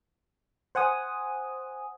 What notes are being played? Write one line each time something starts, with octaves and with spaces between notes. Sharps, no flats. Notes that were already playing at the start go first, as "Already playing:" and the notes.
C5 F#5 G#5 D#6